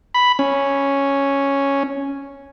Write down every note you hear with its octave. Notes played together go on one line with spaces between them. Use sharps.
B5
C#4